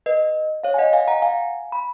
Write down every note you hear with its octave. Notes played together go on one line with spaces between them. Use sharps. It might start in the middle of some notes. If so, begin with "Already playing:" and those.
B4 D#5
C#5 F5
G#5
D#5 F#5
F5 G#5
F#5 A#5
F5 G#5
B5